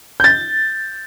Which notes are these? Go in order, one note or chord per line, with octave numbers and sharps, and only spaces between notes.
G6 A6